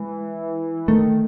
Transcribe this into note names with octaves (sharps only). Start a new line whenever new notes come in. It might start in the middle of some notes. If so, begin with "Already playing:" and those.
Already playing: E3 G#3
D#3 A3